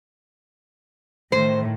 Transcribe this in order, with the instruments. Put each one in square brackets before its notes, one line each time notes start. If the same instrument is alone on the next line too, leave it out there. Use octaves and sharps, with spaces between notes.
[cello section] A2 D#3 [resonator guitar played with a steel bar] C5